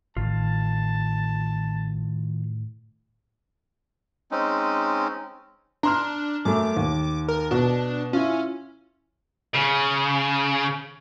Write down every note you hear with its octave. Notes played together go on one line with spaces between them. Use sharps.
A1 A2 D#3 F4 A5
G#3 C4 C#4 D#4
D4 A#5 C6 F6
F#2 A3 D6
D#2
A#4
B2 D4
C#4 E4 F4
C#3